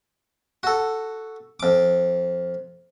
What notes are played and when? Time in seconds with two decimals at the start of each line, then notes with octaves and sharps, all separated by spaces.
0.63 F#4 A4
1.60 F2 D6